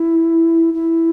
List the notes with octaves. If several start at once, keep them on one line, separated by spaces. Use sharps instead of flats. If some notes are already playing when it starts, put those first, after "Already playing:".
Already playing: E4
E4